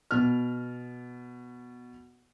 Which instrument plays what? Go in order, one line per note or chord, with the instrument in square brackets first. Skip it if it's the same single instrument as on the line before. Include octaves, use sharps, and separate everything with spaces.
[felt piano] B2 F6